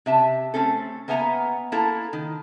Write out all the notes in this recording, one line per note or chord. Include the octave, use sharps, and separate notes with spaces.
C3 E5 A5
A3 C4 C#4 A4
A#3 B3 E5 G#5 A#5
A#3 E4 A4 A#5
D#3